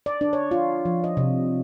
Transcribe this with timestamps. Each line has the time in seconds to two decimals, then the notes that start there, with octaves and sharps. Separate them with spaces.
0.06 D5
0.21 D4
0.33 C#5
0.51 F4
0.85 F3
1.04 D#5
1.17 C3